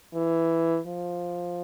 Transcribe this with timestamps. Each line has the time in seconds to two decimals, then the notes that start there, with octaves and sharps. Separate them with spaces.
0.14 E3
0.87 F3